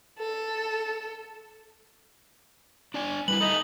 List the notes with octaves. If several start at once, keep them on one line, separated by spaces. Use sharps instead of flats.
A4
D4 D5 G#5
G3 D#4 E4 B4 F#7
D#4 A4 D#5 E5